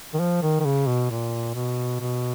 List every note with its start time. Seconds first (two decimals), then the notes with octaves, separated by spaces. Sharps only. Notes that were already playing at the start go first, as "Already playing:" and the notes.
0.14 D#3
0.20 F3
0.42 D#3
0.60 D#3
0.65 C#3
0.87 B2
1.10 A#2
1.54 B2
2.00 B2